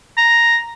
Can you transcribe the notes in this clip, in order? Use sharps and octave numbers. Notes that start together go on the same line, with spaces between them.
A#5